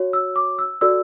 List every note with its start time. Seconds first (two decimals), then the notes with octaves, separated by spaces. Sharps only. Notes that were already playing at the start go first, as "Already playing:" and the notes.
Already playing: F#4 C#5
0.13 E6
0.36 D6
0.59 E6
0.81 F#4 A4 D5 E6